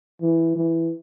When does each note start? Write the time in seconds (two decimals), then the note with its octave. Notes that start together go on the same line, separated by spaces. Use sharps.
0.21 E3
0.56 E3